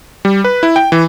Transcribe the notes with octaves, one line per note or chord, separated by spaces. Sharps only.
G3
B4
E4
G5
E3